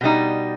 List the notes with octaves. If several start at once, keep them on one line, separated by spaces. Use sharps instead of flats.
B2 G3 D#4